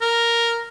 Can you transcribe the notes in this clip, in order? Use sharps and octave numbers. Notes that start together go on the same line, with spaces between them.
A#4